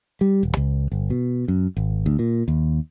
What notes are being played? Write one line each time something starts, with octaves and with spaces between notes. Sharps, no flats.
G3
D#1
C#2
G1
B2
F#2
G#1
D2
A#2
D#2